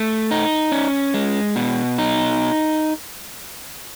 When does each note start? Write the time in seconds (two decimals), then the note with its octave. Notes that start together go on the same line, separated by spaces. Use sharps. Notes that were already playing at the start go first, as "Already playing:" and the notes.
Already playing: A3
0.31 D#4
0.72 C#4
1.14 G#3
1.56 B2
1.98 D#4